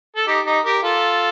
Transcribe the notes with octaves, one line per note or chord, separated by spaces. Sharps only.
A4
D#4 G4
D#4 G4
G4 A#4
F4 A4